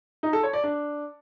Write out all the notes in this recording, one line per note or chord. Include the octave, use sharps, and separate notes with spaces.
D#4
A4
C#5
D5
D4